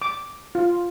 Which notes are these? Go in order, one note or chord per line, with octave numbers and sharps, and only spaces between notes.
D6
F4